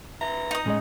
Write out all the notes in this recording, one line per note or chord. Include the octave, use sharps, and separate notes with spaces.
C3 B4 E5 A#5
D#4 D#6
A2 G#3 C#4 G#4 D#5